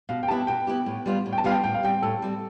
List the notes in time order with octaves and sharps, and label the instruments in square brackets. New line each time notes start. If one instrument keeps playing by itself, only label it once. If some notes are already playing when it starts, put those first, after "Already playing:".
[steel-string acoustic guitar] B2 [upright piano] F5
[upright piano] G5
[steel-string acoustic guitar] B3 E4 G4 [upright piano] A5
[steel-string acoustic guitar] B2 [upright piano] G5
[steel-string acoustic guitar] B3 E4 G4
A2
G3 B3 F4
A2
[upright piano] G5
A5
[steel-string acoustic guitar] G3 B3 F4 [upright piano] F5
[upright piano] G5
[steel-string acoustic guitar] A2 [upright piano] G5
[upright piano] F5
[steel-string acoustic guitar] G3 C4 [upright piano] G5
[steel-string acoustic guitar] A2 [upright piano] A4
[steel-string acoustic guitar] G3 C4